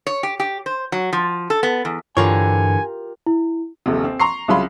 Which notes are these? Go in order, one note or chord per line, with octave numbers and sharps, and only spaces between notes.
C#5
G4
G4
C5
F#3
F3
A4
B3
E2
G2 D3 E3 F4 G4 A#4 C#5 G#5
E4
D#1 A#1 C3
C4
A#5 C6 C#6 C7
C2 C#3 F#3 F4 B5 C6